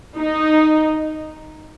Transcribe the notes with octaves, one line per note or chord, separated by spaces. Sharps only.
D#4